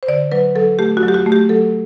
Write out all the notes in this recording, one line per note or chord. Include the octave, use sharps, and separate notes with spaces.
C5
D3 D5
F#3 B4
F#3 A4
A3 G4
F#4
F#3
G4
F#4
A3
G4
F#3 A4